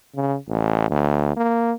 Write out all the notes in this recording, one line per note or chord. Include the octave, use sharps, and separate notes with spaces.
C#3
A1
D2
A#3